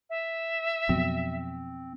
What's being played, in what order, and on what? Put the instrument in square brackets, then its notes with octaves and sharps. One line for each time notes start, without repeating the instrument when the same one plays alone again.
[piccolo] E5
[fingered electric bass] F2 B2 F#3 [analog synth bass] C4